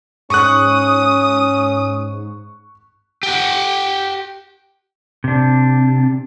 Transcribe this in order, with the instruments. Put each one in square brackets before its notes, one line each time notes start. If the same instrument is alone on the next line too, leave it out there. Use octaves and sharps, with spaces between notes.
[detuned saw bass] G#2 [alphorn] C#4 [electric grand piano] C#6 F#6 [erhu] D#6
[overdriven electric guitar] G4 F#5
[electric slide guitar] C3 D4